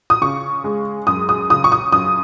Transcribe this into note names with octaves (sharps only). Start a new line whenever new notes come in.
D#6
C#3 C#6
G#3
F#2 D#6
D#6
C#3 D#6
C#6
D#6
F#2 D#6